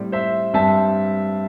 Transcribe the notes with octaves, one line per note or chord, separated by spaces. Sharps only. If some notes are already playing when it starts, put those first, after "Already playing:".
Already playing: A2 G3 C4
C5 E5
G2 G3 C4 E5 A5